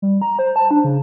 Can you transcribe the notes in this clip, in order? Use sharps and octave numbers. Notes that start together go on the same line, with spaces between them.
G3
A#5
C5
A5
D4
C#3